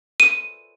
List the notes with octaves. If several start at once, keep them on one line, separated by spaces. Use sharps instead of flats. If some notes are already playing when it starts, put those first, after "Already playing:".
D#7